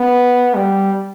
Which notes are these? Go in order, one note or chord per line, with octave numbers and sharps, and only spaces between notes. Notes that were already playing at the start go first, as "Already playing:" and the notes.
Already playing: B3
G3